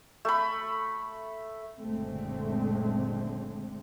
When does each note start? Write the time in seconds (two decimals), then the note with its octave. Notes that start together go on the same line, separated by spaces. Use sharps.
0.25 A3 B5
1.79 F#1 A#2 D3 G#3 A3 C4